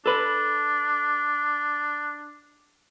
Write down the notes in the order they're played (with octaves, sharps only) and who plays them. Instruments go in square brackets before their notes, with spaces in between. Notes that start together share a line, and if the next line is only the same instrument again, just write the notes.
[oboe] D4 [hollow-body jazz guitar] A4 B4